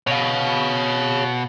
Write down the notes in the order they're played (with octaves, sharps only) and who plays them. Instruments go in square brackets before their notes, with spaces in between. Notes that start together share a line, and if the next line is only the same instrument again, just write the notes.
[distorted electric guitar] B2 [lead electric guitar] C#5 F5